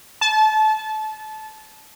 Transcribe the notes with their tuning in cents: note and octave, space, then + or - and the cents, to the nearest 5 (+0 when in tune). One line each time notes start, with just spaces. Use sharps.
A5 -25